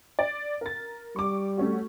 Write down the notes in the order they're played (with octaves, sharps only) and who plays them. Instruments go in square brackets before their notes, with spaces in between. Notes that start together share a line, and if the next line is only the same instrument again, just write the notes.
[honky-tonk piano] D5
A#4 A6
[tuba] G3 [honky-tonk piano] C#6 D6
[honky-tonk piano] A3 C#4 F#4